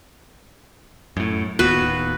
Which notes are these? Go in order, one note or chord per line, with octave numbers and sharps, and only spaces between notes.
F#2 A2
D1 D#2 B3 F#4 B4